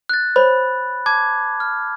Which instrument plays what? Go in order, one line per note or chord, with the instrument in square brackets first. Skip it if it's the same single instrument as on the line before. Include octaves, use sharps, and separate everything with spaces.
[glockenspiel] F#6 A6
[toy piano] C5 C#5 [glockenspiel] B5
[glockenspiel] A5 D6 G#6
F6